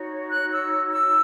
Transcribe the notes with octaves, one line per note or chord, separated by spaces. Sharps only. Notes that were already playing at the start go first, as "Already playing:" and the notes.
Already playing: D#4 F#4 C#5
F#6
E6
E6